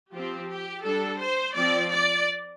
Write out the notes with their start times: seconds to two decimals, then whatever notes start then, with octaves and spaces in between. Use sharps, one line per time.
0.13 F3 C4 G4
0.49 G4
0.85 G3 D4 A4
1.21 C5
1.55 F3 C4 D5
1.92 D5